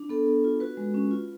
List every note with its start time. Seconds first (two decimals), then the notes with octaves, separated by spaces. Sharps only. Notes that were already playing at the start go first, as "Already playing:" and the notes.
Already playing: D4
0.09 B3 A4
0.26 B3
0.44 F4
0.60 F#4 B4
0.77 G#3
0.94 C#4
1.11 F4